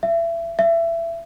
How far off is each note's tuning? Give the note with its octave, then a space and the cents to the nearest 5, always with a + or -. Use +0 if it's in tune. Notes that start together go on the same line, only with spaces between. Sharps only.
E5 +30
E5 +25